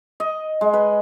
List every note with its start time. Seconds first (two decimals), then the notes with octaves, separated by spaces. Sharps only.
0.20 D#5
0.61 G#3
0.73 B4